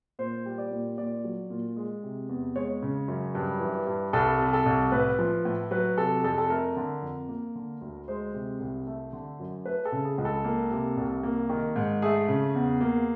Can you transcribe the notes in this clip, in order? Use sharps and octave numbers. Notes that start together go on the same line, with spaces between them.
A#2 C5
G3
D5
A#2
A#2 D5
F#3
A#2
G#3
C3
E2
G#3 C#5
C#3
F#2
G2
E3
G2
C2 A4
C3
A4
C2
A2 B4
F3
A2
F#3 B4
C3 A4
F2 A4
A4
A3 A#4
D3
F2
A#3
D3
D2
G#3 C5
C3
C2
A3
D3
F#2
A3 B4
A4
C#3
G#4
C#2
A4
A#3
C3
C2
A#3
D#3
G#2
A3 G#4
C#3
E2
A#3